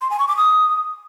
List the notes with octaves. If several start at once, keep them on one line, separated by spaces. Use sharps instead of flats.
C6
G#5
C#6
D6
D#6